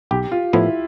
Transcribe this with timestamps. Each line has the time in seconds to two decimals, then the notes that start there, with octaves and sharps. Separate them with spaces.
0.11 B1 G4
0.32 F4
0.53 A2 F3 B3 E4